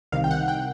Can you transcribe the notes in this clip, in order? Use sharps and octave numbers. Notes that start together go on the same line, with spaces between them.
C2 C3 D#3 F5
G5
F#5
G5